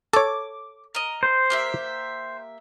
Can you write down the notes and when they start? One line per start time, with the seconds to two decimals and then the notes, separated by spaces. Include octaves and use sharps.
0.13 A4 C#5 D6
0.95 A#4 D#5
1.23 C5
1.50 A#3 G4 E5